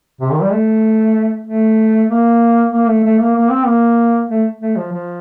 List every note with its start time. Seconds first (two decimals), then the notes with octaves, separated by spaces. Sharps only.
0.21 C3
0.32 D#3
0.42 G3
0.53 A3
1.47 A3
2.09 A#3
2.72 A#3
2.88 A3
3.04 A3
3.19 A#3
3.36 A#3
3.51 C4
3.66 A#3
4.30 A3
4.61 A3
4.77 F3
4.93 F3